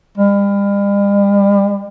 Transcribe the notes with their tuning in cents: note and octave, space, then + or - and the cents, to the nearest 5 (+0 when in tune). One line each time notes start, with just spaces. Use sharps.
G3 +40